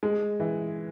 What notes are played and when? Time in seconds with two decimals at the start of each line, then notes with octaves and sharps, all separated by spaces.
0.03 G#3
0.40 E3